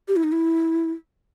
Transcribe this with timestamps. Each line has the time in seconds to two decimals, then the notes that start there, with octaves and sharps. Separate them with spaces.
0.08 G4
0.16 E4
0.24 D#4
0.32 E4